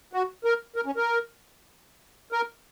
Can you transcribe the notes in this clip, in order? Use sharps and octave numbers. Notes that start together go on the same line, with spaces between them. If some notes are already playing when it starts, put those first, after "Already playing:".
F#4
A#4
A#4
C#4
A#4
A#4